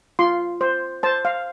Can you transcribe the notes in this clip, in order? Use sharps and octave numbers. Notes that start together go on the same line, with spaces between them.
F4 C6
C5
C5 A5
F5